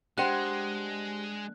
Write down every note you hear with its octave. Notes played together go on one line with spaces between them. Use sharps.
G#3 D4 G4 C5 F#5 G5 F#6